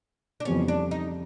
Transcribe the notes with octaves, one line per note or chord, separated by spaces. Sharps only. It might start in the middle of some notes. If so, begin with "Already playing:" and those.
D4
F2 C#3 E3 G3 B3 C#4
D4
D#4